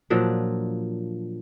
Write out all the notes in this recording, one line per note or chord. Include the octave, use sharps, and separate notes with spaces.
A#2 F3 F#3 D4